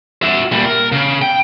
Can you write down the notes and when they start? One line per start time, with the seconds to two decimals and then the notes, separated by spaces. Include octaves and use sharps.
0.23 F#4 E5
0.52 A#2 G3
0.65 A#4
0.92 C#3
1.22 G5